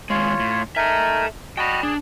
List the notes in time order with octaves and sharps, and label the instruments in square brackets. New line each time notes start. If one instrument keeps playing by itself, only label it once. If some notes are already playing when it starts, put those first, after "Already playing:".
[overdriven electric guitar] D#2 G#3 [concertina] F4 C#5
[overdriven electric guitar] A2
[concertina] D#4 A#4 G#5 [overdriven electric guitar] A4 E5
[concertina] F#4 D#5 A5 [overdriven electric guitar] G5 B5
[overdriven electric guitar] D4 [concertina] G#4